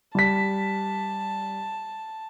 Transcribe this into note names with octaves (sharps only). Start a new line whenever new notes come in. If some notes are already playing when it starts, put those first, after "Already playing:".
G3 A5 B6